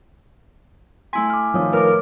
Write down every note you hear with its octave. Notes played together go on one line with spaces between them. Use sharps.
A3 E4 G#5 C6 B6
D6 F6
D#3 F3 D4 C#5 D#6
A2 A#4 B4 C#5 D6 F6